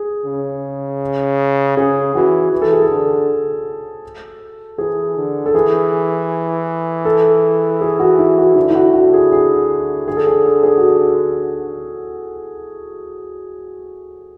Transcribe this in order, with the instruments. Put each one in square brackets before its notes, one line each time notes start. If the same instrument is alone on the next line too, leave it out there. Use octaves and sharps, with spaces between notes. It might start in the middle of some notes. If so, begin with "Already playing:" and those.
Already playing: [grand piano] G#4
[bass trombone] C#3
[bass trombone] C#3 [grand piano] G#4
[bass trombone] E3 [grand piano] F#4
[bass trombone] E3
[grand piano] A4
G#4
A4
[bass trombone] D3
[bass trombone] E3 [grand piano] G#4
[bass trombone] D3
[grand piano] A4
[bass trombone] E3 [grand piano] G#4
[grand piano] A4
G#4
F#4
E4
F#4
[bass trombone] D3 [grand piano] E4
[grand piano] E4
F#4
[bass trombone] D3 [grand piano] F#4
[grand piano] G#4
G#4
[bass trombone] D3 [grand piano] G#4
[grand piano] A4
G#4
A4
G#4
F#4